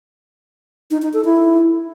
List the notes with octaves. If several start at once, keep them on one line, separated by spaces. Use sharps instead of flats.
D#4
D#4
A4
E4